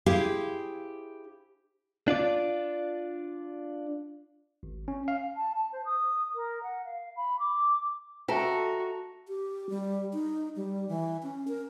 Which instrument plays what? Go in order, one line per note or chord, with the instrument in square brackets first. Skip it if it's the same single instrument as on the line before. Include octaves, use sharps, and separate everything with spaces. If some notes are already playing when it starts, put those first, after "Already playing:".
[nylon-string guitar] E4 G4 G#4 C5 F5
[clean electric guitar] D4 F4 D5
[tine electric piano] G#1
C#4
F5
[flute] A5
A5
C5
D#6
A#4
F#5
F5
B5
D6
[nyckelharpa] F#4 [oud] A4 [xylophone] E5 G5 A5 [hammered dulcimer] A#5
[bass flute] G4
G3
D#4
G3
E3
C#4
A#4